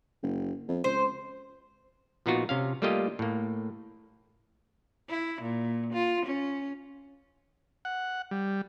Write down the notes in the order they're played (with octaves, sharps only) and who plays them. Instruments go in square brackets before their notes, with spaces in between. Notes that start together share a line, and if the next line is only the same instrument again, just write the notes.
[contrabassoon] F#1
F2
[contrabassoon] C#2 [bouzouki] C5
[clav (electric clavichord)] A#2 F3 B3 D#4 F4 F#4
C3 C#4 F5
G3 A3 A#3 F4 G4 D#5
A2 A#3
[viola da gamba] E4
A#2
F4
C#4
[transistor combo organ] F#5
G3